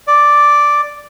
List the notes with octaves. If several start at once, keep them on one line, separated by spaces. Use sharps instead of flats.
D5